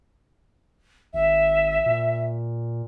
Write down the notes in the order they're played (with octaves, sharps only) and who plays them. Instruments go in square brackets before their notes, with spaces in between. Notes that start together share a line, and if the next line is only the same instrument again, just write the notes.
[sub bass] G#1 [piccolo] E5
[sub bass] A#2